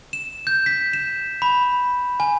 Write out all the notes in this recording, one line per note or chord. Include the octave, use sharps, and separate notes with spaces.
E7
G6
B6
E7
B5
G#5